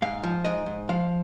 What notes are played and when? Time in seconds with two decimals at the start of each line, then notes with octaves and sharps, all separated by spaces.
0.02 G#2 F5
0.23 F3
0.44 G#2 D#5
0.66 G#2
0.89 F3 F5